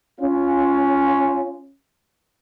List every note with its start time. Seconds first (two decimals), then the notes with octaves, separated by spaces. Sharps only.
0.20 C#4 F4